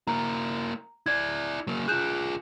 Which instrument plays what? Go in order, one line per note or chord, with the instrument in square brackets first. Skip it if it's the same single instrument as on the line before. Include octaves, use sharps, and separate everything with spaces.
[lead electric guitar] A#3 E4 [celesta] A#5
[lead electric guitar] E4 D5 [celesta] G#6
[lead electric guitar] F#3 A#3
[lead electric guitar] F4 G#4 [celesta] F#6 G6 E7